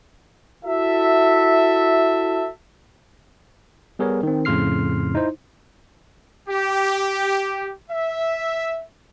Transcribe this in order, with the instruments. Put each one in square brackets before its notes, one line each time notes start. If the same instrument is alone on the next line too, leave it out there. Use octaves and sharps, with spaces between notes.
[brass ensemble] E4 F#4 A4 E5
[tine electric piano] G3 B3 G#4 A#4 C#5
D#3 C4
F2 A2 C#3 C6 F6 C7
D#4 E4 C5
[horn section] G4
E5